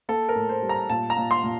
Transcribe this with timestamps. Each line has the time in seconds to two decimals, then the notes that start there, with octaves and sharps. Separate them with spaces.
0.09 A#3 A4
0.29 A#4
0.35 A2
0.49 C5
0.62 G3
0.69 A#5
0.90 A#2 A5
1.10 A#5
1.17 A#2
1.31 C6
1.44 A#2